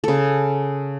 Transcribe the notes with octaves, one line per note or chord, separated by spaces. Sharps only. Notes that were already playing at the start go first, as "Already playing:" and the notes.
C#3 A4